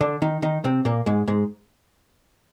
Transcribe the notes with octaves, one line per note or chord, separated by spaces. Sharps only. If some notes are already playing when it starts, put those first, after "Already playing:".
D3 D4
D#3 D#4
D#3 D#4
C3 C4
A#2 A#3
G#2 G#3
G#2 G#3